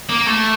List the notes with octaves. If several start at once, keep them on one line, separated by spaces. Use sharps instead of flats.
A#3
A3